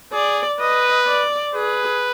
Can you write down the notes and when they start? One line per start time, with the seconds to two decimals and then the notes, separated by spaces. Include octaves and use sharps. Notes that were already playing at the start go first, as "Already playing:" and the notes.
0.13 G#4 D5
0.60 B4 D#5
1.07 D5
1.54 G#4 B4